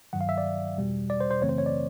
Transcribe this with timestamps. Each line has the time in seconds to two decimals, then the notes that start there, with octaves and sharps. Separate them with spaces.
0.13 G2 D#3 F#3 F#5
0.21 F5
0.29 E5
0.38 D5
0.77 E2 B2 G3
1.10 D5
1.20 C5
1.31 C5
1.41 F#2 C#3 E3 A3 C4 C#5
1.49 C5
1.58 C#5
1.66 D5